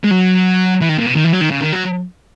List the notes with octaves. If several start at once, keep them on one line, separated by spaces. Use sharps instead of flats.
G#3
F#3
E3
D#3
A#2
B2
D#3
E3
F#3
D#3
C#3
D#3
F#3